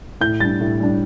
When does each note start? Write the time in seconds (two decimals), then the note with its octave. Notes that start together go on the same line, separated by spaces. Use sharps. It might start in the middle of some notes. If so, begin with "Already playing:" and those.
0.21 A2 G6
0.40 G3 D4 A6
0.61 A2
0.80 G3 D4